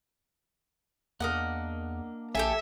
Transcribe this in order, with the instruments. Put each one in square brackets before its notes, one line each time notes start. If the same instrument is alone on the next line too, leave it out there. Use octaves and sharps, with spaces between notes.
[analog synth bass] E2 [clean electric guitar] A#3 D4 [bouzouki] A#4 D#5 F#5
[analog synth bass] A#1 [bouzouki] G4 A4 G#5 [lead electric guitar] E5